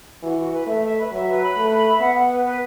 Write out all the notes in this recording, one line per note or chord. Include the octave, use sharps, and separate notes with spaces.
E3 F#4
F#4
B4
A3 E5
E5
B4
F#3 E5
B4
B5
A3 B4
B5
E5
B3 F#5
F#5
B4
B4